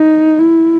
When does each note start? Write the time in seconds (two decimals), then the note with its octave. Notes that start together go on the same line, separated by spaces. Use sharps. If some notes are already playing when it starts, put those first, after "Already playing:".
Already playing: D#4
0.39 E4